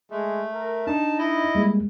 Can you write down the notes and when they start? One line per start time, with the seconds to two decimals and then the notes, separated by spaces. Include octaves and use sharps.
0.11 G#3 A3
0.54 A#4
0.87 D4 D#4 A5
1.18 E4 D#5
1.55 G3 G#3 A#3